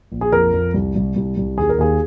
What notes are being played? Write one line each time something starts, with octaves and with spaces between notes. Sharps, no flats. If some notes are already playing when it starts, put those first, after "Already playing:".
A#1
G#4
F2 A#4
F2
C2
C2
C2
C2
D#2 G#4
A#4
D#2 G#4